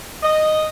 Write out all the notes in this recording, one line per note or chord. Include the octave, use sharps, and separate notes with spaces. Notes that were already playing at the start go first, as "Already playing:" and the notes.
D#5